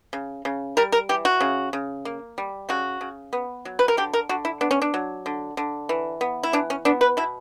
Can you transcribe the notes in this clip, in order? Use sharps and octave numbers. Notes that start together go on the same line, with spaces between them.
C#3
C#3
G3 A#4
A#4
E3 G4
F#4
C#3
C#3
A#3
G3
C#3 F#4
C#3
B3
F#3
B4
A#4
D3 G4
A#4
D3 F#4
E4
B3 D4
C#4
D4
F#3
D3
D3
E3
B3
E4
E3 D4
C#4
B3 D4
B4
B2 E4